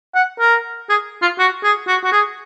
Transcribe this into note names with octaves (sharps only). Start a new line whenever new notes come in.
F#5
A#4
G#4
F4
F#4
G#4
F#4
F#4
G#4